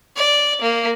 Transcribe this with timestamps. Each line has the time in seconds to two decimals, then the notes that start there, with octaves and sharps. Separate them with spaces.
0.16 D5
0.61 A#3